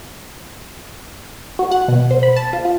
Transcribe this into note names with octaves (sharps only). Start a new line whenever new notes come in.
F#4
F#5
B2
C5
B5
A5
F4
F4